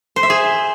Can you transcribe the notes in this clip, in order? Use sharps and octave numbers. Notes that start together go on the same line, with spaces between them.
C5
E5
G#4